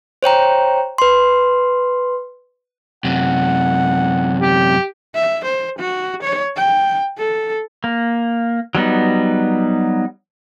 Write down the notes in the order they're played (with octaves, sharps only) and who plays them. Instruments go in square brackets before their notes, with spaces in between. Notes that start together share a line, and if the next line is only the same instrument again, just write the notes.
[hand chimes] C5 C#5 G5 A#5
B4 C6
[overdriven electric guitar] F#2 C3 [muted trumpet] F#5
[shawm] G4
[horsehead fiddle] E5
C5
F#4
C#5
G5
A4
[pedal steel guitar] A#3
F#3 G3 B3 D#4